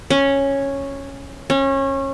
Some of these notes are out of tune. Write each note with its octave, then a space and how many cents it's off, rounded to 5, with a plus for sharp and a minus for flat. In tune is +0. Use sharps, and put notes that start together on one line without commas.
C#4 -5
C#4 -25